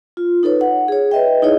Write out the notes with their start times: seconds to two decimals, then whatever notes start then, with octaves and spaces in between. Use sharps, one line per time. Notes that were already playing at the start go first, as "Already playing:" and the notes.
0.17 F4
0.43 D#4 A4 B4 C#5
0.61 F#5
0.88 G#4 C#5
1.11 B4 D#5 E5 G5
1.42 D#4 E4 G#4 C#5 D#5